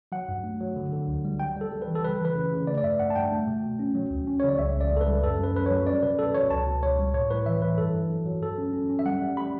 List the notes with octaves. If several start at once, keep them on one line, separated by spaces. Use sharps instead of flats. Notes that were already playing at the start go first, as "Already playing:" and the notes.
F#3 F#5
G2
A3
F#3
D3
D3
D2
G3
G3 G5
G3 A4
G3
B4
E3
A4
C#3 B4
E3 B4
C#3
C#3
A3 D5
D5
G2 E5
G2 F#5
A5
G2 G5
A3
B2
B2
C#4
F#3
D2
C#4
C#3 C#5
D5
C#2 E5
C#2
D5
C#2
A4
B4
G3
F#2 A4
F#2 B4
F#2 B4
F#3 C#5
C#4 D5
B2 B4
B2 A4
B2 C#5
C#2 A5
B2
C#2 C#5
G3
A2 C#5
A2 B4
E3 E5
E3 B4
G2 A4
G2
F#3
F#3
G2 A4
C#4
C#4
C#4
E5
G3 F#5
G3
G3 B5